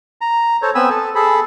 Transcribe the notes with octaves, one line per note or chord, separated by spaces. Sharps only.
A#5
A4 C5 C#5
B3 C4 G#5 B5 E6
A4
G#4 A4 B5